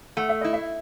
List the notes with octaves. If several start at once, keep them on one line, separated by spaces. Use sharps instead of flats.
A3 F#5
E5
E4 D#5
E5